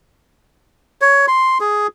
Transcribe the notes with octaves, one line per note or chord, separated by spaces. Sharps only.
C#5
C6
G#4